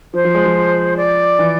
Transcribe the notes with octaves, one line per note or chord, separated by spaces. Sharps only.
F3 C5
F3
G#3
F3
D5
E3